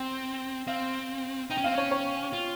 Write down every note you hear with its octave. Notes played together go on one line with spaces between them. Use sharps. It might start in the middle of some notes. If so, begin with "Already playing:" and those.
Already playing: C4 G5
C4 F5
D#4 G5
C#4
C4 F5
C#4 C#5
C#5
F4